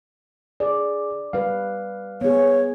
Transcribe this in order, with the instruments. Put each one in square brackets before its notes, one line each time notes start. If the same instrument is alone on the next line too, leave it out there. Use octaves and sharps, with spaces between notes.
[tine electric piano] G#4 [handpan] D5
[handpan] G3 B4 [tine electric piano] F5
[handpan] B3 G#4 [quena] C#5